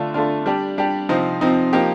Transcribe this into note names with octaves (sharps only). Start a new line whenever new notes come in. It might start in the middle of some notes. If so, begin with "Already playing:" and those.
Already playing: D3 A3 D4 F4
D3 A3 D4 F4
G3 D4 G4
G3 D4 G4
C3 F3 C4 D#4
C3 F3 C4 D#4
F3 A#3 D#4 G4